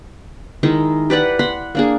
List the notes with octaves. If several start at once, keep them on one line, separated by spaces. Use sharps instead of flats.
D#3 G#3 D#4 E4
G4 B4 D5 F#5
F#5 B5 C6
A#3 D4 G#4